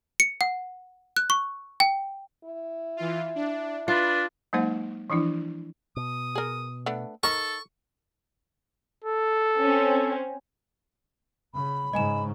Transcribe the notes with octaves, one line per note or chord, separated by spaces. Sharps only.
C#7
F#5
F#6
C#6
G5
E4
E3 F4
D4
D4 F4 B4
F#3 G#3 A#3 D#4 C5 F#5
E3 F3 D4 E4
B2 D#6
G#4 A#4
A3 B3 D4
D#4 A4 A#4 C#6
A4
C4 C#4
C#3 B5
G#2 C#3 D#5 G#5 E7